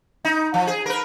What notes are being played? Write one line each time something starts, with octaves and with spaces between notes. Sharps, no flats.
D#4
F3
G#4
A#4 B4